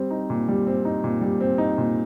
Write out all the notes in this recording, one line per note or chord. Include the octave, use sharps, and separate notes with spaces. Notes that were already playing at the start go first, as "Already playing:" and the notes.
Already playing: G3 C4
D#4
A#2
G3
C4
D#4
A#2
G3
C4
D#4
A#2